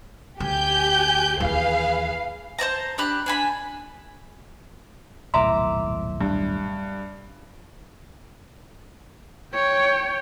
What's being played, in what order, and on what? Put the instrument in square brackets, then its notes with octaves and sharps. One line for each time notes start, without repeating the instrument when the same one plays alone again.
[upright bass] D2 [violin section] G4 G#5 G6
[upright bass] D#2 E3 [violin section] G#4 B4 F5
[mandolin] C5 D5 A5 A#5
D4 G4 B5 F#6
D4 G#5 B5
[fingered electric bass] D#1 B1 A2 [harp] E5 A#5 D6 [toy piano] C6
[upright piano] G2
[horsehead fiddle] C#5 G5